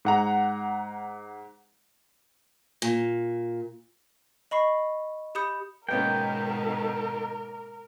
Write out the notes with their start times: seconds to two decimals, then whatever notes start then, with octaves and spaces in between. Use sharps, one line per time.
0.05 G#2 F#5 A#5
2.82 A#2
4.51 D#5 B5 C#6 C7
5.35 G4 B5 D#6 G6 C#7
5.89 G#2 B2 D#3 A#3 B3 C#4 A#4 G5